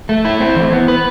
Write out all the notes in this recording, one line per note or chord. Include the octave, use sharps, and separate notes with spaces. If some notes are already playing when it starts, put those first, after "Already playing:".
A3
E4
C4
E3
B3
B4